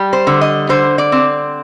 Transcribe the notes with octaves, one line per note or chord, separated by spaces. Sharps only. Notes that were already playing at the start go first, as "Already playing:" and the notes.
Already playing: G3
C5
D3
D#5
D3 C5
D5
C4